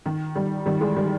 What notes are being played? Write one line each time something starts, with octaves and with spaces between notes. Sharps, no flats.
D#3
D#3 G3
D#3 G3
E3 G#3
D#3 G3